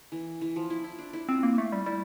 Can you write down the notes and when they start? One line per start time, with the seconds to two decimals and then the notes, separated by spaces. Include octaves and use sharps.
0.12 E3
0.41 E3
0.56 F3
0.70 E4
0.84 E4
0.99 D4
1.13 E4
1.29 C4 F4
1.43 A#3
1.58 A3
1.72 G3
1.86 G3 E4